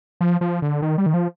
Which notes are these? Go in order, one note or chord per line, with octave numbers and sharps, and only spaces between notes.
F3
F3
D3
D#3
G3
D#3
F3